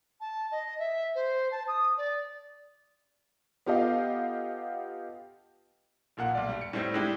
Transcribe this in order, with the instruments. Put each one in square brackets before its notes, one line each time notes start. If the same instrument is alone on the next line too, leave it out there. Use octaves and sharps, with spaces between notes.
[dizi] A5
D#5
E5
C5
A5
D#6
D5
[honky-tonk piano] B3 F4 G4 A4 D#5 F5
[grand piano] A#1 A#2 F#5
B1 D5
G3
C#7
A2 G3 A3 C4
G#3 D4 E4 G4